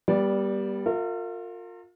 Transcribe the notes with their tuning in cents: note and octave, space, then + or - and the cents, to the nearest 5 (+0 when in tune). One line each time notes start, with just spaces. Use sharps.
G3 +5 B3 -35 D5 -10
F4 +30 A#4 -40 E5 +0